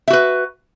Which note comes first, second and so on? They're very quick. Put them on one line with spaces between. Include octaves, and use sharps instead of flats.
E5 F#4 B4